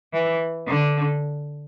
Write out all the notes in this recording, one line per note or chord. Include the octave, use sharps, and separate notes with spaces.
E3
D3